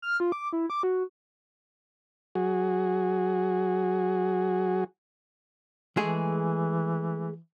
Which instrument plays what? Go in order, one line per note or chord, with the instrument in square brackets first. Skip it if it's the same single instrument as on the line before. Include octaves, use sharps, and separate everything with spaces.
[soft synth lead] F6
F4
D6
E4
D6
F#4
[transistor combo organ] F#3 F#4 G#4
[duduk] E3 [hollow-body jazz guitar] G#3 A3 G#4